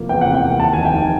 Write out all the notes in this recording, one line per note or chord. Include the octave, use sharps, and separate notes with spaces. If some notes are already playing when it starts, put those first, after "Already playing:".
Already playing: C3 F3 A#3
E2 G5
C3 F#5
G5
A#3
D#2 A5
F1 G#5
G5
D#3